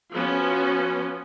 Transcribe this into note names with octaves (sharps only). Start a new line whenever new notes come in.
F3 B3 C#4 F#4